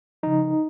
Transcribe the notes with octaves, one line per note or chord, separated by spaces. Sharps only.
C#3 F3 D#4